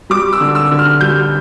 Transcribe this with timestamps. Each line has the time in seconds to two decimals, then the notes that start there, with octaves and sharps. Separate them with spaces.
0.10 G3 D6
0.33 E6
0.41 D3
0.55 E6
0.71 D3
0.79 F6
1.01 G3 G6